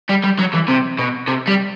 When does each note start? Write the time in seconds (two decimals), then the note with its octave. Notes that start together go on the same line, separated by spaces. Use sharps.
0.09 G3
0.24 G3
0.39 F#3
0.54 E3
0.68 C3
0.99 B2
1.28 C3
1.48 G3